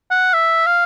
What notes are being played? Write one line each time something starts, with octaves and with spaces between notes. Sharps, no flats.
F#5
E5
F5